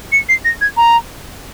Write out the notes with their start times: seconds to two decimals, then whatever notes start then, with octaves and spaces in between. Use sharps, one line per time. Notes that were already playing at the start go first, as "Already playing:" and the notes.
0.12 C#7
0.29 C7
0.45 A#6
0.61 G#6
0.77 A#5